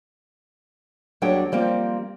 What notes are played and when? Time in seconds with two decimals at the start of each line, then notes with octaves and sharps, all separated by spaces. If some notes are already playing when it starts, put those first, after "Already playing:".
1.22 D#2 F#3 G3 D4 G#4 G5
1.52 F3 G3 A#3 C4